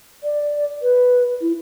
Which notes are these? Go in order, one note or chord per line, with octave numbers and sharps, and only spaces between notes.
D5
B4
E4